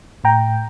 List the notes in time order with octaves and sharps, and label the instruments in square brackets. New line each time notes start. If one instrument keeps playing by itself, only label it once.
[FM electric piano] A2 G5 A#5